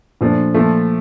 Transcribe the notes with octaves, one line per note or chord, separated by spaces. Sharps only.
A#2 F3 A3 D4
A#2 F3 A3